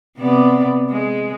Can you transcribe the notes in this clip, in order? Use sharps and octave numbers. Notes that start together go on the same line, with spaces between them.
C3 B3 D5
G#3